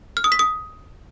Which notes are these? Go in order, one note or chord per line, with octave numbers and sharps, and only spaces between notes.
F6
D#6
B6
D#6